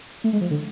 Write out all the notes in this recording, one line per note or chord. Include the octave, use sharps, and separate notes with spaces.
A3
G#3
F3
D3